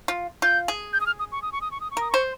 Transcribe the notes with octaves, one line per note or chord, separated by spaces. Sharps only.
F4
F4 G6
G#4
G6
D#6
F6
D#6
C#6
D#6
C#6
D#6
C#6
D#6
C#6
A#4 D#6
C5 C#6